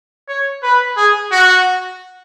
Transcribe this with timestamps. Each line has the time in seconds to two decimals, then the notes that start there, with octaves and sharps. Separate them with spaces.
0.28 C#5
0.63 B4
0.97 G#4
1.31 F#4